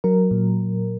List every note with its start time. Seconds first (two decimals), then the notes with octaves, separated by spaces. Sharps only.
0.04 F#3 A#4
0.31 A#2